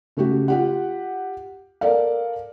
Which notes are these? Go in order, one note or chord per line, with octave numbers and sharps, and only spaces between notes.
C#3 A3 F#4 G4
F4 G4 F#5
A4 A#4 D5 F5